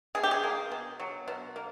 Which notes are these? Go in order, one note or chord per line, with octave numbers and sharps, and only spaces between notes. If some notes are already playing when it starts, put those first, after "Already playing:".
B2 G#4
G4
G#4
A#3
B2
F#3
B2
A#3